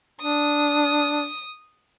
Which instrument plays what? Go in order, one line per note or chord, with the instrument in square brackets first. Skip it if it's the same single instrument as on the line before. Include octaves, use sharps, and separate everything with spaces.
[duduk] D4 [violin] D#6